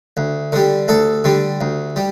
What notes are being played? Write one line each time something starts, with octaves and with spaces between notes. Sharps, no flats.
D2
D3 G3
D2 A4
D3 G3
D2
G3